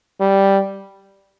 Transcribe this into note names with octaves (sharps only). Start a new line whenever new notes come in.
G3